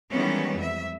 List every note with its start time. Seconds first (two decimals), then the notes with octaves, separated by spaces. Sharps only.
0.11 D#3 E3 G3 G#3 B3 C#4
0.56 F2 E5